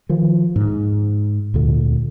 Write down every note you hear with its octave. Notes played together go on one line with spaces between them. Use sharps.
D#3 F3
G#2
D2 A#2 D3